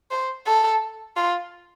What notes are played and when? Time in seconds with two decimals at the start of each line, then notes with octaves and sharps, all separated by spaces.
0.11 C5
0.47 A4
1.17 F4